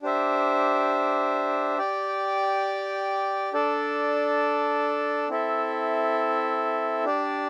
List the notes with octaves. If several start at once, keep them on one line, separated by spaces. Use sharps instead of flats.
D4 G4 C5 E5
G4 D5 G5
D4 A4 D5
C4 E4 A4 E5
D4 G4 D5